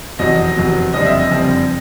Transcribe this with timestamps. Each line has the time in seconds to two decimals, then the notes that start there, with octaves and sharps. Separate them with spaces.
0.19 F1 E2 B2 F#3 D#5
0.56 F1 E2 B2 F#3
0.93 F#1 F2 D3 G3 C4 D#5
1.06 E5
1.19 D#5
1.30 F#1 F2 D3 G3 C4